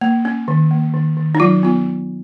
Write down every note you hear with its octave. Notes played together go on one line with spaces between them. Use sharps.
A#3
C#4
D#3
A#3
D#3
D#3
D#4
F#3 F4
B3 F4